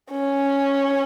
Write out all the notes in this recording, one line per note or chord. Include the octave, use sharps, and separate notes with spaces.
C#4